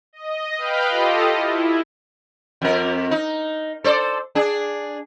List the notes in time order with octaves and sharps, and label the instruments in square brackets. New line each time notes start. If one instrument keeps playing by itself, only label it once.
[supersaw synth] D#5
B4 F5 G5 B5 F6 G6
F4 G4 A4 D#5
E4
[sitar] F2 A#4
D#4
A4 C5 D5
D4 G#4